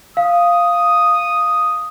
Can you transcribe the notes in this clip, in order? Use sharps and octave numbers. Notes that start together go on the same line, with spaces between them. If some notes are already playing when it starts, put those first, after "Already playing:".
F5 D#6